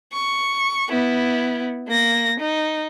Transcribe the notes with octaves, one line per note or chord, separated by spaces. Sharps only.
C#6
B3 E4
A#3 A#6
D#4